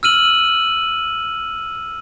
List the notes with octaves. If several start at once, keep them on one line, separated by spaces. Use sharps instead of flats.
E6 F6 D#7 F#7